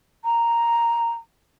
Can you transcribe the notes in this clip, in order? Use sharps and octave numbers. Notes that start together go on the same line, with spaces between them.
A#5